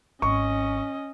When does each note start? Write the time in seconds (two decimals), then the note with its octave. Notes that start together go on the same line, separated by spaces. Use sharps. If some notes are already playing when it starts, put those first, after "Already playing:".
0.22 G#1 C#4 D#5 C#6